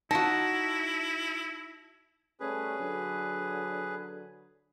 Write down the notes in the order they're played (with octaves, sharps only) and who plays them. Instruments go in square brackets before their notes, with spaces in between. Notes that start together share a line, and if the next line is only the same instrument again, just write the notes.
[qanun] D#4 F#4 [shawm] E4 [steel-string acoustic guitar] A5 [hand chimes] A#6
[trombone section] G3 A3 C#4 [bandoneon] G#4 B4
[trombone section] D3 F#3